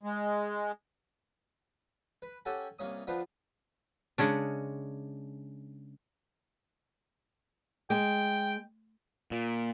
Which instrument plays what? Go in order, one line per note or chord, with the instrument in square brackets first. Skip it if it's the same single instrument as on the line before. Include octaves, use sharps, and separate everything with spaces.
[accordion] G#3
[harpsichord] B4
C#4 G4 A4 F#5 G#5 A5
C2 A#3 C#4 D#6
F3 B3 D4 B4 C5
[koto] C#3 G#3 C#4 D4
[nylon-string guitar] G#3 [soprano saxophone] G5
[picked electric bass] A#2